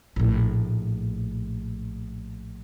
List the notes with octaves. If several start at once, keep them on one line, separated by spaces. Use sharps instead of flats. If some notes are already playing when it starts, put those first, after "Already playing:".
A#1 A2